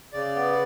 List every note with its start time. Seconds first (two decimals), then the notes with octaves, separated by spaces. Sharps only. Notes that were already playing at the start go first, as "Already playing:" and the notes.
0.13 C#3 D5
0.36 B3